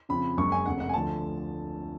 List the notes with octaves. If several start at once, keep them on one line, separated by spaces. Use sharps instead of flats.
F2 C#3 F3 B5
F#1 F#2 C#3 G#3 C#6
G#5
F1 F2 C#3 F#5
F#5
G#5
D2 D3 F3 A5